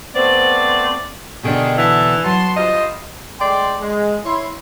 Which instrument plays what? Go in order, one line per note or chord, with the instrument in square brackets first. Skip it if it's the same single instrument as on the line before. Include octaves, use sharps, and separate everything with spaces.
[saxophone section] A3 B3 C4 C5 D5
[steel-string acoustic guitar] B2 D3 D4 [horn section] D#3 G4 G#4
[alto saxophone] E3 [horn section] E5 F#5 A5
[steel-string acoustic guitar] F#3 [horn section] B3 A5 C6
[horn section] G2 F4 C5 [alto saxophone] D#5
[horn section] G#3 A3 D5 G5 C6
G#3
E4 C#5 C6